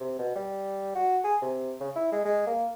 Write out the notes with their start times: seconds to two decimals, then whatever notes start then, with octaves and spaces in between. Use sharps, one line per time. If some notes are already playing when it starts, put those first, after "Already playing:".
0.01 C3
0.19 B2
0.36 G3
0.96 F#4
1.24 G#4
1.42 C3
1.81 C#3
1.96 E4
2.12 G#3
2.25 G#3
2.47 A#3